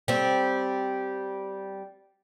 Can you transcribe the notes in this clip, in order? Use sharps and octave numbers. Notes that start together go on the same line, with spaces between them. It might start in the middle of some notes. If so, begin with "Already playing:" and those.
G3 C4